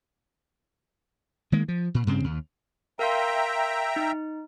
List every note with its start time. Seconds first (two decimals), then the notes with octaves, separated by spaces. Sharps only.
1.52 D#3 G#3 A#3
1.68 F3
1.94 A#2
2.07 G2 C#3 C4
2.24 D#2
2.99 A#4 E5 F5 G5 A#5 C6
3.96 D#4